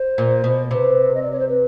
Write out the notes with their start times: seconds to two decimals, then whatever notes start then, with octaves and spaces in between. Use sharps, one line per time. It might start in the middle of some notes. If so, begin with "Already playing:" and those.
Already playing: C5
0.18 A#2
0.44 B2
0.70 C3 B4 C5
1.14 D#5
1.22 D5
1.31 C#5
1.39 C5
1.48 B4